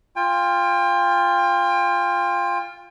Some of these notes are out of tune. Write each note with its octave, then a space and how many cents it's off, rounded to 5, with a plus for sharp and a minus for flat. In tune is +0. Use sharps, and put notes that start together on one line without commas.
F4 +0 G5 +35